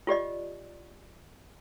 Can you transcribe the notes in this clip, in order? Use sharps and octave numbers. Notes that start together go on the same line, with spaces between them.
F4 G4 D5 D#5